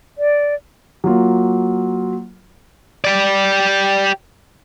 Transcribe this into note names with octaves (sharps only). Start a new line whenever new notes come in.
D5
F#3 A#3 F4
G4 D5